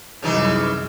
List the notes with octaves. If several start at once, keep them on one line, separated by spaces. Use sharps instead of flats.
C2 F#2 C#3 E3 D#4